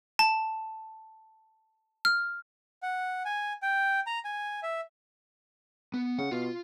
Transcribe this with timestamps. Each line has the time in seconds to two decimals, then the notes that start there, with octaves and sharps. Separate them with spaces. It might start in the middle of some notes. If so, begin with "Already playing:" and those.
0.19 A5
2.05 F6
2.83 F#5
3.25 G#5
3.62 G5
4.07 A#5
4.25 G#5
4.63 E5
5.94 B3
6.19 C#3 F#5
6.31 B2 F4